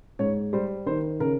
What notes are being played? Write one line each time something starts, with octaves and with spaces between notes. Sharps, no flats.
G#2 C#5
G3 C5
D#3 C5
C#3 A#4